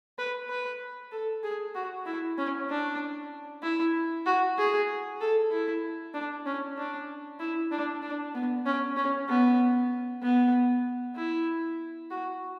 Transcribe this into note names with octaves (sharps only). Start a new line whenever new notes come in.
B4
B4
A4
G#4
F#4
E4
C#4
D4
E4
F#4
G#4
A4
E4
D4
C#4
D4
E4
D4
D4
B3
C#4
C#4
B3
B3
E4
F#4